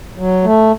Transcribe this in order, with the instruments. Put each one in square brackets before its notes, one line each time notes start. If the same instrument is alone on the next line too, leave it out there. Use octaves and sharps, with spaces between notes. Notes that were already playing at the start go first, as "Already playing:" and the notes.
[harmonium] F#3
A3